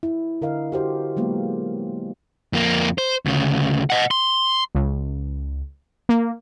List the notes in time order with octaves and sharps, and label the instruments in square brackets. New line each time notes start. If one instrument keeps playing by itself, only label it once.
[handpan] E4
D3 A#4 D#5 F5
F#4 G4 C5
F#3 G#3 A#3 B3
[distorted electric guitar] F2 A#3
C5
D2 C#3
D#5 F#5
C6
[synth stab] C#2
A#3